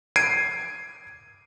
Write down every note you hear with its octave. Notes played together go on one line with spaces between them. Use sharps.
G#6 C7 D7 D#7